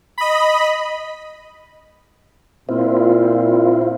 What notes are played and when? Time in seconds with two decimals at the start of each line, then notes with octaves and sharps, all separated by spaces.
0.18 D#5 B5
2.69 A#2 C4 E4 F4